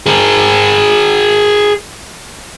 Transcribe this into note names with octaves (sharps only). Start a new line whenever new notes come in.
G#4 A#4